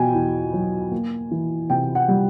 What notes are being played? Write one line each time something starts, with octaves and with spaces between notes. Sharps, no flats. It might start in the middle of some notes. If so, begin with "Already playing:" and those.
Already playing: B2 G5 G#5
E2
F#3
A#3
E3
C3 G5
F#5
G3